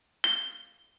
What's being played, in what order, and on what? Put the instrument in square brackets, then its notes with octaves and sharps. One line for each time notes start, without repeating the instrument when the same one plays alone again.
[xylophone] G7